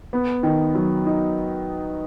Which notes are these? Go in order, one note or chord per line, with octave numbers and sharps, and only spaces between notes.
B3
D#3
F#3
D#4